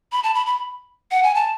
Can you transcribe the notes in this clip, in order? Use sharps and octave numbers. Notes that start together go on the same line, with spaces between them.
B5
A5
B5
B5
F#5
G#5
A5